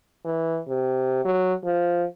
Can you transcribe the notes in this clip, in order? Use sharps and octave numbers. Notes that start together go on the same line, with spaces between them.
E3
C3
F#3
F3